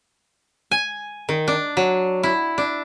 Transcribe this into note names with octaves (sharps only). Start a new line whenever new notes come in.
G#5
D#3
D4
F#3
E4
D4